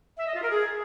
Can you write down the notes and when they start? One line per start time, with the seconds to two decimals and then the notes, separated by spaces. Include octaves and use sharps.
0.19 E5
0.26 D#5
0.34 F4
0.42 A#4
0.50 G#4